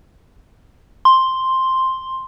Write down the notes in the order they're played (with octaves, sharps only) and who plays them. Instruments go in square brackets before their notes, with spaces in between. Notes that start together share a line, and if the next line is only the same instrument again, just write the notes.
[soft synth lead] C6